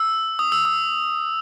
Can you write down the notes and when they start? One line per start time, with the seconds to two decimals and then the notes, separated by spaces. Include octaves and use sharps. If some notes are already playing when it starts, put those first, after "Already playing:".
Already playing: E6
0.39 D#6
0.52 E6
0.65 D#6